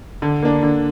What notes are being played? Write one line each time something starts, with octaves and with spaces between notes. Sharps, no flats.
D3
A#3 D4
D3